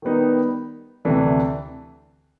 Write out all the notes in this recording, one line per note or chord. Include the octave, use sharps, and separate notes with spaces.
D#3 G3 B3 D#4
D2 C3 E3 A3 D4